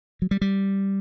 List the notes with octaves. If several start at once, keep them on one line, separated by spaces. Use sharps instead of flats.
F#3
G3
G3